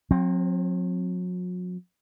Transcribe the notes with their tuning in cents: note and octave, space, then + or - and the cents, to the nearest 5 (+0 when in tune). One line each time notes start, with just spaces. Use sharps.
F#3 -40 C4 +10